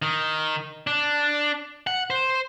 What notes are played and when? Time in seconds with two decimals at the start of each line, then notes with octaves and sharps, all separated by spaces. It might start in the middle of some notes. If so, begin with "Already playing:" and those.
0.02 D#3
0.87 D4
1.87 F#5
2.10 C5